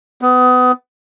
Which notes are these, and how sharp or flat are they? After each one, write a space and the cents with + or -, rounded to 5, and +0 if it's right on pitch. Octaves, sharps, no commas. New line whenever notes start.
B3 +25